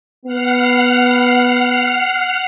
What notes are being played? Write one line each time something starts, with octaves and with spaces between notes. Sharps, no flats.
B3 F#5 F6 C7